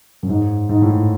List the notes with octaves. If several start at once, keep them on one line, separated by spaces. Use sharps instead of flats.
F#2
G#2
G#2
A2